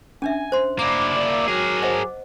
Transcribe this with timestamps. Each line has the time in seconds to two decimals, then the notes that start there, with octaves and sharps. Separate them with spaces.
0.22 C#4 D4 E5 G#5
0.52 C5 C6
0.79 A#3 D4 E4 D6
1.16 D5
1.48 F#3 G#4 A#4
1.82 C5 D#5 F#5